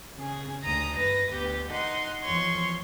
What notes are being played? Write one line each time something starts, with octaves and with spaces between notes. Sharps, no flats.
C#3 G#4
D2 A#5 D#6
G2 B4 A#6
D2 B3 G4
D#4 F#5 C6
E2 F3 C#5 C6 C#6